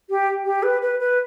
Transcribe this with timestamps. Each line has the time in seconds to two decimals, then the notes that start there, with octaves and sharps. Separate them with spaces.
0.10 G4
0.45 G4
0.63 B4
0.82 B4
1.00 B4